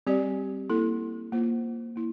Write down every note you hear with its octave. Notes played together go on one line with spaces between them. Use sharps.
G3 C4 G4 D5
A#3 E4 A4
A#3 F4 C5
A#3 E4